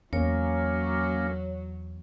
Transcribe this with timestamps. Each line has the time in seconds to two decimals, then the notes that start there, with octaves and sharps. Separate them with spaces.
0.13 E2 F#3 A#3 C#4 C#5